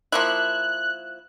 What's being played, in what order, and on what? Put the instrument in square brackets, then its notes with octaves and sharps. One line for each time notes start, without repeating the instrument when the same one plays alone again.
[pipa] F3 A#3 E4 [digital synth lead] F#6